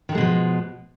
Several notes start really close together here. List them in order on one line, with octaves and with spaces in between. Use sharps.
D#3 D3 G#3 B2 F3